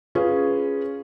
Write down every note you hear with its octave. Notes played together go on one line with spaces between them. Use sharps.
C#4 F4 G#4 B4